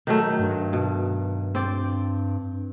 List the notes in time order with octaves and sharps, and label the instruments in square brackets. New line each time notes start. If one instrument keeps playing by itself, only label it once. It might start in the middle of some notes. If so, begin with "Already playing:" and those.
[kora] D#3 F#3 A3
[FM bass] G2
[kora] B2
C4 D5